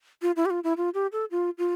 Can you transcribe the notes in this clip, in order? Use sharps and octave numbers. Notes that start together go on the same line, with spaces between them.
F4
E4
G4
F4
E4
F4
G4
A4
F4
F4